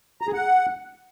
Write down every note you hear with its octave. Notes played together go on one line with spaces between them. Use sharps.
A#5
G#4
F#5